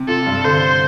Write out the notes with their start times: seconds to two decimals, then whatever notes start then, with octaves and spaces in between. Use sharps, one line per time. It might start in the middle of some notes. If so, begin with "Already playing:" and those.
Already playing: C3
0.08 F4 A4
0.27 G2
0.44 D3 C5